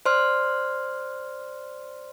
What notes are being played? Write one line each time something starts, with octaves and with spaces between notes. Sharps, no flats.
C5 D5 C6 F6